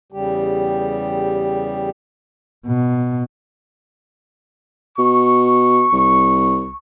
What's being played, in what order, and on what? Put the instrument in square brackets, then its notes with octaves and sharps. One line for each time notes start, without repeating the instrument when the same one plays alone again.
[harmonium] E2 C#3 G3 G4
[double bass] B2
[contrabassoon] B2 [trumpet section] C#6
[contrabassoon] C2